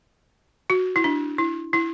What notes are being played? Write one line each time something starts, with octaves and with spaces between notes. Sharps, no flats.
F#4
E4
D4
E4
E4